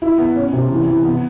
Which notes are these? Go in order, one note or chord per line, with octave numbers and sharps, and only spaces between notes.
E4
B3
C#4
C3
E3
E3
B3